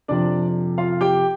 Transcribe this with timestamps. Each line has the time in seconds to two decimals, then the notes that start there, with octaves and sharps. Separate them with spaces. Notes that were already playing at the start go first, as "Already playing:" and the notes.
0.08 F2 C3 F3 D4 D5
0.78 F4 F5
1.01 G4 G5